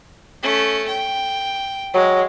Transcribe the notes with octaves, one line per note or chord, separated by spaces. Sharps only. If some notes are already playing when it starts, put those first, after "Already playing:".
A3 C#4
G5
F#3 G#3